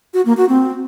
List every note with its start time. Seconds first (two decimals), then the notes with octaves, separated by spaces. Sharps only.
0.14 F#4
0.25 A#3
0.37 F#4
0.49 C4